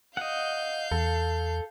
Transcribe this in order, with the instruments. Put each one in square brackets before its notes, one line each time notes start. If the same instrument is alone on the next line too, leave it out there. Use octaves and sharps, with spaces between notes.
[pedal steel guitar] D#5 F#5 [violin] F5 G6
[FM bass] E2 [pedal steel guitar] A4